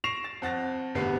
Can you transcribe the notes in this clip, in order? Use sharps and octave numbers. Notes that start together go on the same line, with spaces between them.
C#6 A#6 C7 D7 E7 F7
A6
F2 F#5 A6 A#6
G#1 D2 C3 B3 B4 C7